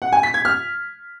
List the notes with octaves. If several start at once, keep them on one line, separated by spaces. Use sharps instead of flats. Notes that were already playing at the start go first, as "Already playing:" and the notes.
F#5
G#5
B6
G#6
F6